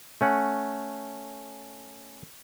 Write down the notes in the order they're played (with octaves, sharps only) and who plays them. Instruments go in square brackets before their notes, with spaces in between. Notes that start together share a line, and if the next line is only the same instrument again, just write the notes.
[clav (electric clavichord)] A3 C#4 F#5